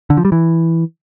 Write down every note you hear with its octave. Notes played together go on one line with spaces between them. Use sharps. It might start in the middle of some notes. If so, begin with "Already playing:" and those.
D3
F3
G3
E3